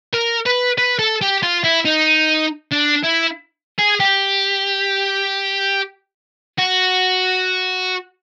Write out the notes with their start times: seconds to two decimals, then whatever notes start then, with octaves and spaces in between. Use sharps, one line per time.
0.13 A#4
0.46 B4
0.78 B4
0.99 A4
1.21 G4
1.43 F4
1.64 E4
1.85 D#4
2.71 D4
3.04 E4
3.79 G#4
4.00 G4
6.59 F#4